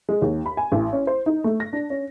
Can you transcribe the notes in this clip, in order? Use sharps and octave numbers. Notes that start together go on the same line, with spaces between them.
G#3
D#2
B5
G#5
A1
C#4
C5
D#4
A3
A#6
D4
C#4